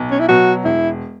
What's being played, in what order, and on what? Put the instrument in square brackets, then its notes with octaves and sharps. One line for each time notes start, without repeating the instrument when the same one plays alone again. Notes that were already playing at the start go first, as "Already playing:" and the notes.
Already playing: [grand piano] B1
[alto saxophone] C#4
E4
[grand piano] B2 F#3 [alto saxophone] F#4
[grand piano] E1 [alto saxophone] E4